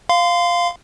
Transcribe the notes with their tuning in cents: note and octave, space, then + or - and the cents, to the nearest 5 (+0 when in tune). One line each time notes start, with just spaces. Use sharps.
F5 +0 C6 -30